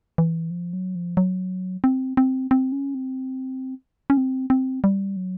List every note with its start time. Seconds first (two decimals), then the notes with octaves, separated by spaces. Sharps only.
0.18 E3
0.51 F3
0.73 F#3
0.95 F3
1.17 F#3
1.84 C4
2.17 C4
2.51 C4
2.72 C#4
2.95 C4
4.10 C#4
4.17 C4
4.50 C4
4.84 G3
5.17 F#3